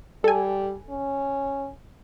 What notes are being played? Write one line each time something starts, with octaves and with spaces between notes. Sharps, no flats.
G3 A4 G#5
C#4